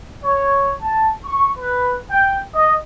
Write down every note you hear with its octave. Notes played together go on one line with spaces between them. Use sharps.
C#5
A5
C#6
B4
G5
D#5